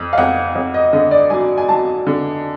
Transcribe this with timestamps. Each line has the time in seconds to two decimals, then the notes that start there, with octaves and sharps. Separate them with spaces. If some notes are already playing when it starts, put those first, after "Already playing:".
Already playing: F2
0.13 F5
0.18 F2 F#5
0.55 F2
0.74 D#5
0.93 D3 D#5
1.11 D5
1.30 F#3 G#5
1.58 G#5
1.69 F#3 A5
2.07 D3